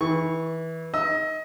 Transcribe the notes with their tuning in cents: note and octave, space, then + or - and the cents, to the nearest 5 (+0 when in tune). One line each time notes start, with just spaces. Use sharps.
E3 -20 C#6 +0
D#5 +25 E6 +0